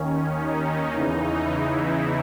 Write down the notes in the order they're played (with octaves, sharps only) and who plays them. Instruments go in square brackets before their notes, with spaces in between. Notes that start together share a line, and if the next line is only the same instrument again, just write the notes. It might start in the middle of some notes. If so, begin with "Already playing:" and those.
Already playing: [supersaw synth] D#2 D#3 C#4
D#4
E2 C#3 E3
E4